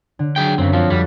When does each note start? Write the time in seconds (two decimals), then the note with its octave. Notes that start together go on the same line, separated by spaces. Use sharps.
0.19 D3
0.36 F#3 G#4 G5
0.58 F#2 C#3 C4
0.73 F3 C4 F5
0.90 F2 G3 F#4 A6